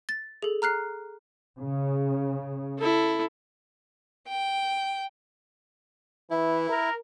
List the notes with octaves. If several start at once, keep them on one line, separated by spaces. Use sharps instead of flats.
A6
G#4 A4
A#5 F6 F#6 C7
C#3
E4 A4
G5
E3 E4
A#4